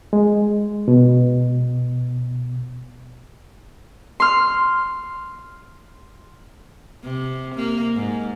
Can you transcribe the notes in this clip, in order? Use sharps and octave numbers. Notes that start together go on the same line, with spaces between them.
G#3
B2
C6 F6
C3
A#3
G#2